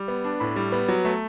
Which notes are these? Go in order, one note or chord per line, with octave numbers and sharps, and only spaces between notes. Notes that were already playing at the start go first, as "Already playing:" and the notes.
Already playing: G3
B3
D4
A2 B5
G3
B3
F#3
A3